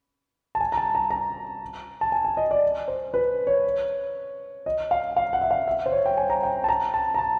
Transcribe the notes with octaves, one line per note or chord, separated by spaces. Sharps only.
A5
G#5
A#5
A5
A#5
A#5
A5
G#5
G#5
D#5
D5
C5
B4
C#5
D#5
F5
F5
F#5
E5
F5
E5
C5
C#5
G5
G#5
A#5
G5
A5
A#5
A5
A#5
A5